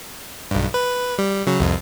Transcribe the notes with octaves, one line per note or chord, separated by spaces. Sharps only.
B1 G2
B4
G3
C#3 F#3
C2 F2